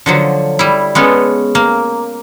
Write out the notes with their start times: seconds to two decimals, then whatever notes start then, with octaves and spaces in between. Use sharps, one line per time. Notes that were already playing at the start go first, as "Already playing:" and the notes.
0.06 D3 F3 F#3
0.59 G3 E4
0.95 G#3 B3 C#4 A4
1.55 A#3